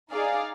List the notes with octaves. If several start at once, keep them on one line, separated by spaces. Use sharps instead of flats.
D#4 G#4 D5 F5